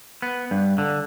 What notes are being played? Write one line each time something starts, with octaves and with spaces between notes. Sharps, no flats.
B3
G2
D3